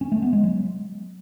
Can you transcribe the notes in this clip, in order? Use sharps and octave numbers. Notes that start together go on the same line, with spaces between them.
C#4
A3
B3
G#3
F#3